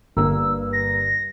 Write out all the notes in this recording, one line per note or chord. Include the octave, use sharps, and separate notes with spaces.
G1 G2 A#3 E6
A#6